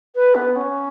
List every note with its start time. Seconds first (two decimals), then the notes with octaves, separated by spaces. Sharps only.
0.15 B4
0.35 B3
0.56 C#4